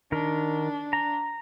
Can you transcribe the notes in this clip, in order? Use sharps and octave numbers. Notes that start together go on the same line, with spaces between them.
D#3 D4 A#4
A#5